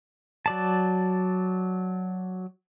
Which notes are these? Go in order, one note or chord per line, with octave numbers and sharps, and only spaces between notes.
F#3 D5 A5